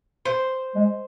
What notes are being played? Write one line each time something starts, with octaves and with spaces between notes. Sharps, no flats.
C5
G#3